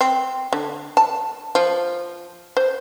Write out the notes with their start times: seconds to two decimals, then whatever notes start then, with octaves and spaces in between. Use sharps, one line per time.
0.01 C4
0.53 D3
0.97 A5
1.55 F3
2.57 C5